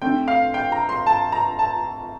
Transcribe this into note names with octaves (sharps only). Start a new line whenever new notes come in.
D3 A3 C4 G5
F5
G5
A#5
C6
A5
A#5
A5